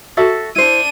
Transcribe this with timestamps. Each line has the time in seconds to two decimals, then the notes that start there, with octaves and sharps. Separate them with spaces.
0.17 F#4 A4 E5
0.56 D4 E4 C5 D#7